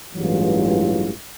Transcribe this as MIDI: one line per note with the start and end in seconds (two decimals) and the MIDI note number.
0.15 1.11 33
0.15 1.11 43
0.15 1.11 52
0.15 1.11 54
0.15 1.11 56
0.15 1.11 65